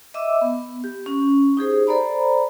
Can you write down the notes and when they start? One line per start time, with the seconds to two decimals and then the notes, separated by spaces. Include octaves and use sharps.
0.14 D#5 E5 D6 E6
0.41 B3
0.84 G4
1.06 C#4
1.57 D#4 G4 G#4 C5
1.87 A4 C5 D5 A#5 B5